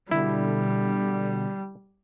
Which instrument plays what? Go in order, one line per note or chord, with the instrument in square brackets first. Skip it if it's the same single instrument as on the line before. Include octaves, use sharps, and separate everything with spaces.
[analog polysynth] B2 D3 [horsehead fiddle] G3 [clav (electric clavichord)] E4